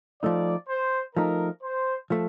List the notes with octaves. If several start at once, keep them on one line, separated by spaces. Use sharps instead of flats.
F3 A3 D#4 D5
C5
F3 A3 D#4 A#4
C5
F3 A3